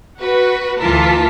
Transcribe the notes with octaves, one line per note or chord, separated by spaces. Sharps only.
F#4 B4
D2 E3 F4 A#4 A5 B6